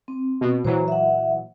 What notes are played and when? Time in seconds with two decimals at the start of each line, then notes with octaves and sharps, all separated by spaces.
0.08 C4
0.41 B2
0.65 A#2 E3 F#3 C5 A#5
0.88 E5 F#5